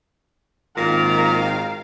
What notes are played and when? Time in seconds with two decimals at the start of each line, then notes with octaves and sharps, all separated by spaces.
0.77 G#1 A#2 D#3 A#4 F5